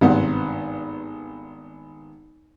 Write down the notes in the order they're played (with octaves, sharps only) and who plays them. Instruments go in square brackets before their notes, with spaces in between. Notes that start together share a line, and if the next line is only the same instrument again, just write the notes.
[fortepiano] G#1 G2 C3 B3 F#5